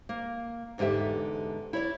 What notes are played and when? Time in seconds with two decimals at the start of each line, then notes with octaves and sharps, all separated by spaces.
0.09 A#3
0.78 E2 G#2 D3 G4 E5
1.73 E4 C#5 D5